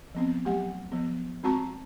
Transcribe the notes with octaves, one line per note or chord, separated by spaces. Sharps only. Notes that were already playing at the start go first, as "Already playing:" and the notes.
F3 B3 C4
F#3 A3 G4 F#5
F3 B3
G#3 C4 F#4 A5 A#5 C#6